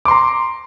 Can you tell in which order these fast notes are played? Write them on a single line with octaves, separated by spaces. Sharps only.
D6 C6 A#5